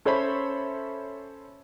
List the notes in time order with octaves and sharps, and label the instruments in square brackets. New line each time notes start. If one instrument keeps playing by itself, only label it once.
[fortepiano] C#4 A4 C5 C#5 E5 B5